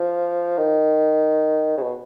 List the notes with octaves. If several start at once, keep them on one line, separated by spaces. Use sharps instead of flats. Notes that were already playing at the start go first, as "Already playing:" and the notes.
Already playing: F3
D#3
C#3
B2